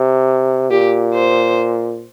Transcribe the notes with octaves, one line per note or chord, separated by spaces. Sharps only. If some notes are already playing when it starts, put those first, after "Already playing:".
Already playing: C3
A#2 G4
C5